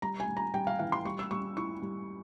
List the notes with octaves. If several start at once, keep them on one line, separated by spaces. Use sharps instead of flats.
G3 A#5
G#5
G3
A#5
G3 G5
F5
E3 F5
C6
G3 C#6
E6
G3 C#6
E4 C#6
G3